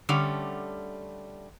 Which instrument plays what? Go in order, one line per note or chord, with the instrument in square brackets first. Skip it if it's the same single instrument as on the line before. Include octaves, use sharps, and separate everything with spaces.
[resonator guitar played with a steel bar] D3 G3 A3 C#4